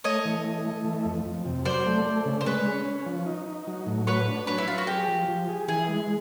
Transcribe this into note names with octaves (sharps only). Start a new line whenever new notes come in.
A3 C#5 D#5
E3
A3
A3
E3
F2
F2
C3
F#3 C5 D5
A3
A3
C#3
C5
G#3 B4 C#5
C#4
C#4
F3
D#4
D#4
F#3
A2
F#4 B4 C#5
D4
F#3 B4 C#5
E4
F#3 F4
F#4
G4 G#4
F3
F3
G#4
E3 G#4
G#3